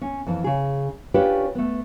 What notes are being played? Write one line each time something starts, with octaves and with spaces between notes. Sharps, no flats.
C#4
F2 E3 A5
C#3 G#4
C#4 D4 F4 G4 B4 C#5
A3 B3